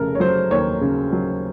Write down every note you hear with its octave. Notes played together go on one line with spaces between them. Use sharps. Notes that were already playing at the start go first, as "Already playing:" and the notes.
Already playing: F1 C#3 A4 A#4
C#5
F#3 C5
D#2 C#5
C#3
F#3